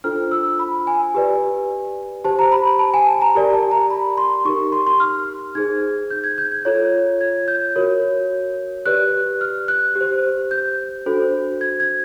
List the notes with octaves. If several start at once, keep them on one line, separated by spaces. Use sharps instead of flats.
D4 F4 A4 C5 F6
E6
B5
G#5
G4 B4 D5
G4 C5 A5
A#5
B5
B5
A5
G#5
A5
A#5
G4 A#4 D5
A5
A#5
B5
C6
D#4 G4 A#4 C#6
C6
C6
F6
D#4 G#4 C5 G#6
G6
G#6
G6
G#6
F4 A4 C#5
G#6
G6
F#4 A#4 C#5
G4 B4 D5 F#6
F6
F#6
G4
C5
G6
D4 F#4 A4 C5
G#6
G#6